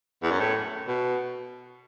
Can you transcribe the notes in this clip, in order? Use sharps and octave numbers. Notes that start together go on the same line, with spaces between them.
E2
F#2
A2
B2